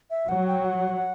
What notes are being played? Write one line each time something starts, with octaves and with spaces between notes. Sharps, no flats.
E5
F#3 F#5
G5
F#5